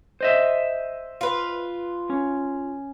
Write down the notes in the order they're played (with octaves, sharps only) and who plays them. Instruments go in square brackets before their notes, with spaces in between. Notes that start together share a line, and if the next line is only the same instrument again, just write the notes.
[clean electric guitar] C5 D#5 E5
[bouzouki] F4 B4
[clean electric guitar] C#4